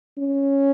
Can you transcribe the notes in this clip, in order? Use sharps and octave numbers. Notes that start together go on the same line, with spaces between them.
C#4